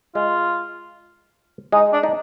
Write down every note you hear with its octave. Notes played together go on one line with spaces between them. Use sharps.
G#3 F4
G#3 D#4
D4
D#4